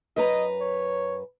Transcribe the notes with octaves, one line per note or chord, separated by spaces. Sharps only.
F#2 B4 D#5 A#5
C#5